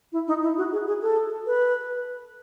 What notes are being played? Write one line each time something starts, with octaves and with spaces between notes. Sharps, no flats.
E4
D#4
E4
F#4
G#4
G#4
A4
B4